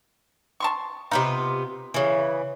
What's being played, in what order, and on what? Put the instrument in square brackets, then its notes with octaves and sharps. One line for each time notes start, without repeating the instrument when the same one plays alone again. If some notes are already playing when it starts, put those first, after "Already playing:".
[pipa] A5 C6 C#6
[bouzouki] C3 B3 F4 [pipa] D#4
[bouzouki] C#3 E3